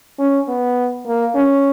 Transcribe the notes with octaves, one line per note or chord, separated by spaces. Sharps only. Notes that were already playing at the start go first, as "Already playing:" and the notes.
C#4
B3
A#3
C#4